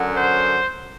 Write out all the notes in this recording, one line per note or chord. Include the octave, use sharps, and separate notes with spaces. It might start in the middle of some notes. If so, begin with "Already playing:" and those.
Already playing: F#2 D3 F#3
C5